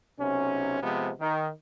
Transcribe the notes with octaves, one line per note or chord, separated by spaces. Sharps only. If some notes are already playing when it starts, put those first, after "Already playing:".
B1 C3 C#4
C3 F3 G#3 B3
D#3